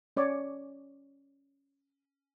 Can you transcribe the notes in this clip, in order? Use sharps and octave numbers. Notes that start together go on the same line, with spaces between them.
C#4 C#5 D5 D6